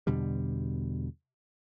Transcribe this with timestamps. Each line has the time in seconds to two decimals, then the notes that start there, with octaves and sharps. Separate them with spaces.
0.07 E2 B2 D3 G3